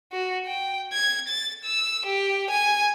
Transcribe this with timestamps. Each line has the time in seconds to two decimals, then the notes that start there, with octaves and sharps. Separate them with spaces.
0.12 F#4
0.47 G5
0.93 G#6
1.28 A6
1.64 E6
2.06 G4
2.50 G#5